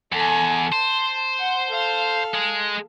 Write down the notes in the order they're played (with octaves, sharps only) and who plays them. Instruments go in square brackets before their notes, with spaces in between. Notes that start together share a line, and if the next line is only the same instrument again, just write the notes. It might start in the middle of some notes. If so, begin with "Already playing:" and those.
[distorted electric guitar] E2 [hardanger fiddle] A4 G#5
[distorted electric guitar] C5 [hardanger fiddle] A5
[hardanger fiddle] F#5
A4 F5
[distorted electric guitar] G#3